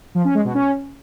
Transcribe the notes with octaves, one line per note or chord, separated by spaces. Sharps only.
F3
C#4
G#3
B2
C#4